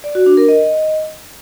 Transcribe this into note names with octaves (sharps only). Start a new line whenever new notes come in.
D5
F#4
D4
A#4
D#5